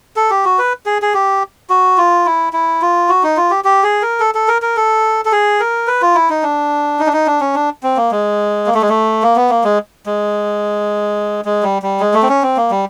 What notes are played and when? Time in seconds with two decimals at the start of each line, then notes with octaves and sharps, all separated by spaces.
0.16 A4
0.30 G4
0.45 F#4
0.58 B4
0.86 G#4
1.02 G#4
1.14 G4
1.70 F#4
1.98 F4
2.26 E4
2.53 E4
2.82 F4
3.09 F#4
3.23 D#4
3.37 F4
3.50 G4
3.64 G4
3.83 G#4
4.02 A#4
4.20 A4
4.35 A4
4.48 A#4
4.62 A#4
4.77 A4
5.25 A4
5.32 G#4
5.60 A#4
5.87 B4
6.02 F4
6.15 E4
6.30 D#4
6.43 D4
6.99 D#4
7.07 D4
7.13 D#4
7.26 D4
7.41 C#4
7.55 D4
7.83 C4
7.97 A#3
8.11 G#3
8.66 A#3
8.74 A3
8.82 G#3
8.89 A3
9.22 A#3
9.36 B3
9.49 A#3
9.64 G#3
10.06 G#3
11.45 G#3
11.63 G3
11.82 G3
12.00 G#3
12.14 A3
12.23 C4
12.29 C#4
12.43 C4
12.57 A#3
12.71 G3